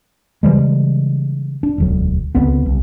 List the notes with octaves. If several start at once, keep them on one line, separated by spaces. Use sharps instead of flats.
C#3 E3 G3 G#3
D4
E1 D2 F#3
C#2 D3 B3 C4
C2